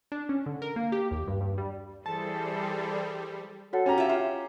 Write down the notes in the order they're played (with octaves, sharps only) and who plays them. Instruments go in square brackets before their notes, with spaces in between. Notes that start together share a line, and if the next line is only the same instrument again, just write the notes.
[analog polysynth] D4
C#4
D3
A#4
A#3
G4
D#2
G2
G2
G3
[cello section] E3 A4 C5 [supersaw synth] G3 [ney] G#4 [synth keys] A5
[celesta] F#4 C#5 F#5 [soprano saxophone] A4
[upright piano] C#4 A#5 [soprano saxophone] G4
[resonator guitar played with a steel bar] F4 E5
F4